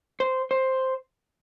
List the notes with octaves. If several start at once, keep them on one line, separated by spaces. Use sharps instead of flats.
C5
C5